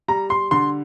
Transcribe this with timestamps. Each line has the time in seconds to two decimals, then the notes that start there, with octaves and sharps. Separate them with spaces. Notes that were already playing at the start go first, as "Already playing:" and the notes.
0.08 G3 A#5
0.30 C6
0.51 D3 C6